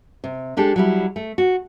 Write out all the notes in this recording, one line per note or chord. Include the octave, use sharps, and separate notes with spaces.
C3
G#3 D4 G4 A4
F#3 G3 E4
A3
F#4